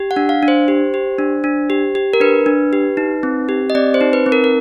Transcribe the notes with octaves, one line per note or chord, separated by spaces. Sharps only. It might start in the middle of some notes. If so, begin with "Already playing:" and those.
Already playing: G4
F#5
D4
F5
D4
C5
G4
G4
D4
D4
G4
G4
A#4
D4 B4
D4
G4
D#4
C4
G4
D#5
C4 D5
C5
D#4
B4
C4
A#4
A#4